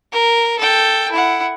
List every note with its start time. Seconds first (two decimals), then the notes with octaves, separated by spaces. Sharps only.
0.12 A#4
0.59 A4 G5
1.12 E4 F#5